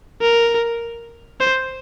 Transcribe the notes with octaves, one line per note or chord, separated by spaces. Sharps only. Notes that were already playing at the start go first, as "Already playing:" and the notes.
A#4
C5